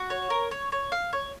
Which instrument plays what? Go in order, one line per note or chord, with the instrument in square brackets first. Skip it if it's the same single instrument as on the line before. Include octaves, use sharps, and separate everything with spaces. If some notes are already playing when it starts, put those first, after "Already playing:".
Already playing: [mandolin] F#4
C#5
A#4
C#5
C#5
F5
C#5